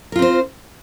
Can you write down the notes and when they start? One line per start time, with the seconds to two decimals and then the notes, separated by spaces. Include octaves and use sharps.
0.12 A#4
0.16 F4
0.19 C4
0.22 C5